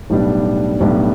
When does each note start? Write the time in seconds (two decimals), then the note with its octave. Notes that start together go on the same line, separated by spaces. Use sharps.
0.10 B1 A2 G3 B3 D4
0.80 B1 A2 G3 B3 D4